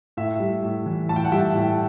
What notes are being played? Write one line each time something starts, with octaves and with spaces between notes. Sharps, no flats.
A2 E5
G3
A2
E3
A2 A5
G5
F#5
G3 E5 G5
A2